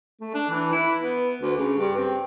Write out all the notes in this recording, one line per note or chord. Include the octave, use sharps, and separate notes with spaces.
A3
D4
E3
E4
B3
D2
C#3
G2
C4